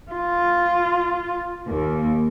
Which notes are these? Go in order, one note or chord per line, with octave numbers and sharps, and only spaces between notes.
F4
D#2 A#3